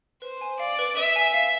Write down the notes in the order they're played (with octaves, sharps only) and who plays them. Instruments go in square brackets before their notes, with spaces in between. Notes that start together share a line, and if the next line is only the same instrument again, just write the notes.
[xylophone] B4 [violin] C5
[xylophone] G#5
[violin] D5 [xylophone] F5
[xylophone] B4
[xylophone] B4 [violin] E5
[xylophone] G#5
F5